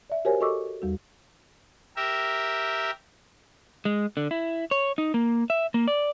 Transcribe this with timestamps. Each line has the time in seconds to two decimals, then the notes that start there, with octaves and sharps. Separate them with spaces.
0.10 D5 E5
0.25 F#4 G4 A#4 C5 C#5 G#5
0.40 F#4 A4 D#5 C#6 D6 E6
0.82 E2 G3 F#4
1.96 G4 A#4 E5
3.85 G#3
4.17 D3
4.31 E4
4.71 C#5
4.98 D#4
5.14 A#3
5.50 E5
5.74 A#3
5.88 D5